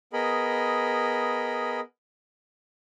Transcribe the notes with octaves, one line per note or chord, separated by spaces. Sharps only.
B3 G#4 A#4 D#5 B5